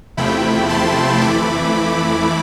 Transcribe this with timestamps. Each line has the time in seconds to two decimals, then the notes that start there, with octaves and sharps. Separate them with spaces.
0.17 E2 C3 F3 A3 E4 G5 B5
0.69 A5 C6
1.21 F2 E3 A3 E4 B5 D6